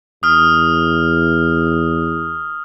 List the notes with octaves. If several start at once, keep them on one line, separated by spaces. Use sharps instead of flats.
E2 D#6 F6